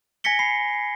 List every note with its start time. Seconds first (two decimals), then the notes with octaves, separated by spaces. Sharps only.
0.24 G#5 G#6 A#6 B6 C#7 G7
0.39 B5 C7